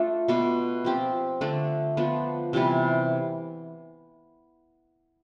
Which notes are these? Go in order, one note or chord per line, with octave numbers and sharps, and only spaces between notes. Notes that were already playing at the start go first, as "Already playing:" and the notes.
Already playing: A3 D4 F4 A4
B2 B3 D4
F3 C4 G4
D3 A3 D4
F3 B3 D4
C3 E3 G3 B3